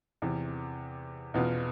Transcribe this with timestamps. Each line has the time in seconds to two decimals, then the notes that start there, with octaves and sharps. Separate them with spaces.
0.22 E2 C3 E3
1.34 E2 B2 B3 F4